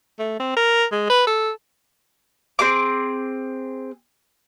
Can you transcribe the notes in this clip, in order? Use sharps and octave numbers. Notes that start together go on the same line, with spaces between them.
A3
C4
A#4
G#3
B4
A4
C4 G#4 D6